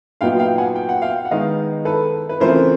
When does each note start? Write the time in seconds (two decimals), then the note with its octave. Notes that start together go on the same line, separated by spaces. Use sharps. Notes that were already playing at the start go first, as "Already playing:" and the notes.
0.21 A#2 F#3 B3 D#4 F5 G5
0.39 F5 G5
0.58 F#5 G#5
0.75 G5
0.89 F#5
1.02 F5 G5
1.25 F#5
1.31 D#3 G#3 B3 D#4 D#5 F5
1.85 A4 B4
2.29 B4
2.40 C#3 E3 A3 C4 F4 A#4 C5